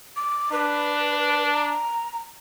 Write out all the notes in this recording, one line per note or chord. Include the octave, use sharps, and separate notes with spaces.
D6
D4 B4
A#5